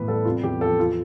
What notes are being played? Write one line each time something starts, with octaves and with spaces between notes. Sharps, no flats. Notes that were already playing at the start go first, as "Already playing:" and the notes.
Already playing: A2 E3 B3 B4
G3 A4
C3 F4
E2 G4
F3 A4
F3 F4